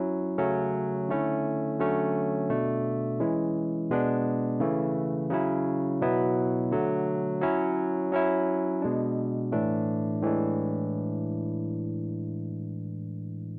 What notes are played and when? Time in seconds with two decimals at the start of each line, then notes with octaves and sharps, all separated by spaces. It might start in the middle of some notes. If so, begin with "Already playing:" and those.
Already playing: F#3 C#4 E4
0.38 C#3 F#3 A3 C#4
1.09 D3 A3 C#4 E4
1.79 D3 F#3 A3 C#4
2.50 B2 A3 D4
3.20 E3 G#3 C#4 E4
3.90 B2 G#3 B3 D4
4.60 C#3 E3 A3
5.30 C#3 F#3 C#4 E4
6.01 B2 F#3 B3 E4
6.71 D3 F#3 A3
7.41 F#3 C#4 E4
8.12 F#3 C#4 E4
8.82 B2 G#3 D4
9.52 A2 E3 A3 D4
10.22 A2 E3 G#3 D4